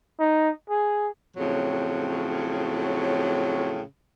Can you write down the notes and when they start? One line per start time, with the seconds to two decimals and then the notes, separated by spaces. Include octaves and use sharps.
0.20 D#4
0.69 G#4
1.35 F2 A2 C#3 F#3